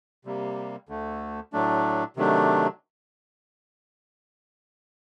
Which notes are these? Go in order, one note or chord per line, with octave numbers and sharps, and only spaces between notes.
C3 G3 A#3
D2 D3 A3
A2 F#3 A3 D4
C3 D#3 F#3 A3 D4